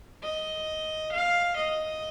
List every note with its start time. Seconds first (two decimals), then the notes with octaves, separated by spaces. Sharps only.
0.23 D#5
1.12 F5
1.56 D#5